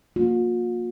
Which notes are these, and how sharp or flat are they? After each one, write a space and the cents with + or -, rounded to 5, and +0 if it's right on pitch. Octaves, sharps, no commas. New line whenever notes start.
A#3 +0 F4 +45